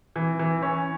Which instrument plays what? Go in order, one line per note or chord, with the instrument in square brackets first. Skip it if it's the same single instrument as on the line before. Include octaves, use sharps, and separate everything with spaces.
[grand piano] E3
E3
C#4